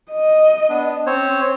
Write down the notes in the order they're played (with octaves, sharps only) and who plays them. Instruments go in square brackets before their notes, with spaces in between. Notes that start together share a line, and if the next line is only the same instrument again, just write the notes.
[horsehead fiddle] D#5
[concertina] B3 D4
[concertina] C4 C5 C#5 [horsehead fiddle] C#4